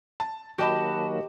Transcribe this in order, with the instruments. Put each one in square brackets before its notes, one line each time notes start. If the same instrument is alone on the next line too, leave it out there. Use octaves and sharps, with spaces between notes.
[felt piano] A5
[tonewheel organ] D#3 F#3 A#3 [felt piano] F#4 D#5 B5 [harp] G4 [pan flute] A5